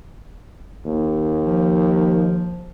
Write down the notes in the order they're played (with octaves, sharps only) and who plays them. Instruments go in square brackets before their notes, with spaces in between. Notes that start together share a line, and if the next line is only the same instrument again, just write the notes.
[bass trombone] D#2
[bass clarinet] F3